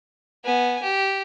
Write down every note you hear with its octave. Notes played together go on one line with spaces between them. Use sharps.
B3 G#5
G4